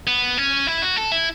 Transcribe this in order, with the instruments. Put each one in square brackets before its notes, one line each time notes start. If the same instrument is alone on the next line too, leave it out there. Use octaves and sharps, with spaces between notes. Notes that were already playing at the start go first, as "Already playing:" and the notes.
[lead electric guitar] B3
C#4
E4
F#4
A4
E4